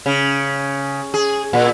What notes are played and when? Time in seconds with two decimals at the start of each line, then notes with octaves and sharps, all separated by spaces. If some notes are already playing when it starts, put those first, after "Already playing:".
0.06 C#3
1.14 G#4
1.53 A#2